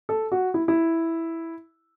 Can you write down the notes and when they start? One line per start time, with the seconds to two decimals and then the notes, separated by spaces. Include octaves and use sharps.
0.09 A4
0.32 F#4
0.54 E4
0.68 E4